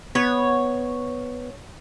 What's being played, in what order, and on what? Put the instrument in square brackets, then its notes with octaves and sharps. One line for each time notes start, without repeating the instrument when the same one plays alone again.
[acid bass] B3 [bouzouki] C#5